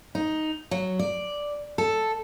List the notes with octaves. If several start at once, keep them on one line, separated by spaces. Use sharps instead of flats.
D#4
F#3
D5
A4